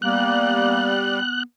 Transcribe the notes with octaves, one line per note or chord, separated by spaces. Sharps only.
G3 A#3 B3 F#6